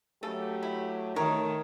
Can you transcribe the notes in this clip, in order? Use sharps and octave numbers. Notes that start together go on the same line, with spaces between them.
C#3 F#3 A3 G4 A4
E4
D#3 A3 G4 A#4 C#5